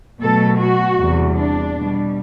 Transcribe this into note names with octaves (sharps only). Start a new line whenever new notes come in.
B2 F#3 A3 A4
F#4
E2 C3 G3
D4
B2 G3